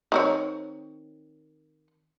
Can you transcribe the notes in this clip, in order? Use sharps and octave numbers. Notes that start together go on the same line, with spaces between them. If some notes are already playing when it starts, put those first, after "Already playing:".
D#3 C4 C#5